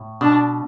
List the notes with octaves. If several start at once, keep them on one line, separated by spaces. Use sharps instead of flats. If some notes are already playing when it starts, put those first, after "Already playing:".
Already playing: A2
B2 D4